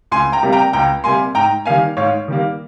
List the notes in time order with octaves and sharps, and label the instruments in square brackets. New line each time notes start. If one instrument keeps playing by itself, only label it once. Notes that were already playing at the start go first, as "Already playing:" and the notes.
[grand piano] C#2 G#5 C6
G5 A#5
C3 G3 A#3
G5 A#5
C#2 G5 A#5
C3 G3 A#3 G#5 C6
G#2 G5 A#5
D#3 G3 A#3 F5 G#5
G#2 C#5 F5
D#3 G3 A#3